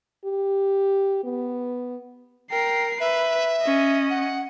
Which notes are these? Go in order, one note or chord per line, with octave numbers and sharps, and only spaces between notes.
G4
B3
A#4 G5 C7
B4 E5
C#4 D#5
F#5